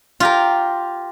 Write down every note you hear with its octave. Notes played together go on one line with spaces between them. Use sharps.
F4 G4 A#4